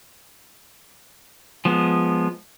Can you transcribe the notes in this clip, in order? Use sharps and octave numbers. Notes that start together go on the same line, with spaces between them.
F3 G#3 B3